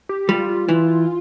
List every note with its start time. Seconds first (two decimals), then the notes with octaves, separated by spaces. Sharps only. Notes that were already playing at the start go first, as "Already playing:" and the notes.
0.09 G4
0.29 G3 F4
0.49 F4
0.69 E3